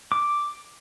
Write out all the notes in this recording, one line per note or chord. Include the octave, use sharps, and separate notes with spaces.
D6